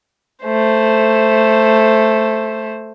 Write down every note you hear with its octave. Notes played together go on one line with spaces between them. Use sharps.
A3 C5